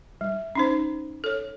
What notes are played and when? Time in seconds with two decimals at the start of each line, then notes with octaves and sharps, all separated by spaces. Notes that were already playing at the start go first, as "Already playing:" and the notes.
0.21 G3
0.55 C#4 D#4 C5
1.24 A4 C#5